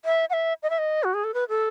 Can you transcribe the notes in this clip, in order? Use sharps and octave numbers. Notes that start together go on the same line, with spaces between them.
E5
F#5
E5
D#5
E5
D#5
F#4
G#4
A4
B4
A4